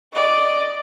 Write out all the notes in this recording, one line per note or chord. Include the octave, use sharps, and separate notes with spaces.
D5 D#5